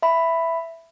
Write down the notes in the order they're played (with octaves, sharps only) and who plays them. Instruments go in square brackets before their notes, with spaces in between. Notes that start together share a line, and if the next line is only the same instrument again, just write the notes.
[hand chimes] E5 B5